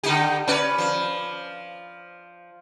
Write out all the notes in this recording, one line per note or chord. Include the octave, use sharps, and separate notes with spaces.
D3 D#4 G4
C#4 B4 D5
F3